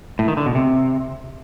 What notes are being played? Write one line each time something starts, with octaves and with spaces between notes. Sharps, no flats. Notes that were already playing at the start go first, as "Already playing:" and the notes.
A2
D#3
D3
B2
C3